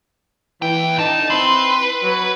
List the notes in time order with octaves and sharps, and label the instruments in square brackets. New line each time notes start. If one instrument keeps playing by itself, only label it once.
[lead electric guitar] D#2 G5 [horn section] E3
[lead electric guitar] F2 A5 [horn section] D3 D#4
[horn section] C4 E4 C6 [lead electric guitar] B4
[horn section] F#3